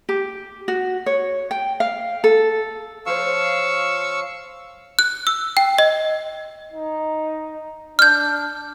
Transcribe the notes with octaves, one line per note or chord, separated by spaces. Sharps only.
G4
F#4
C#5
G5
F5
A4
F3 C5 C#5 F5 C#6 E6
F#6
E6
G5
D#5
D#4
D4 F6 G6